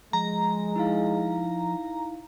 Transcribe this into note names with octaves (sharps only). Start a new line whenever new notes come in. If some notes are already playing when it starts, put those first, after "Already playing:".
F3 G#3 A#5
D#4 E4 F5